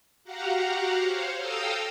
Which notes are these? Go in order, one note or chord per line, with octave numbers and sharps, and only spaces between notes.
F#4 G4 F5 F#5 A#5
C5 C#5 F5
A4 F5 G5 A#5 D#6 E6